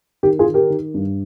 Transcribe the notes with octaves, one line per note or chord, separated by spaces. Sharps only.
D#3 G4
F4 G#4
D#3
G4 A#4
D#3
G2